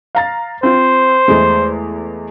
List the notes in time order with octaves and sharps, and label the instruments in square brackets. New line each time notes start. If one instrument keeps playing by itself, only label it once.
[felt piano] F5 A#5 A6
[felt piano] C4 F4 [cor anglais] C5
[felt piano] E2 G#3 A3